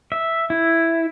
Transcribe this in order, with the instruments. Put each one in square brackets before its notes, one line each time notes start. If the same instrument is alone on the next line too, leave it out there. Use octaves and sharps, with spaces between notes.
[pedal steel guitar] E5
E4